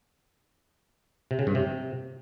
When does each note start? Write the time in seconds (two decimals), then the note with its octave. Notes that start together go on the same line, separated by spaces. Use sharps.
1.31 C3
1.39 C#3
1.47 G2
1.55 C3